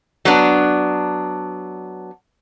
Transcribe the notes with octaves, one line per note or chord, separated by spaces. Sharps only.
F#3 B3 D4